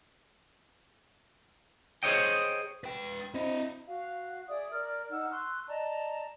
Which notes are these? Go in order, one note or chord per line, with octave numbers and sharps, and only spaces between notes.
G#4 C5 C#5 D#5 G5
B4 G5
C4 E4 D#5
F#4 F5
G#4 D5 E5 D#6
A#4 D5 F6
D#4 F#5 E6 F6
C6 C#6 E6 F#6
D5 D#5 A5 A#5